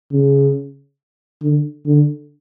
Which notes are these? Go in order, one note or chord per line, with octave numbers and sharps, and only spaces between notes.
C#3
D3
D3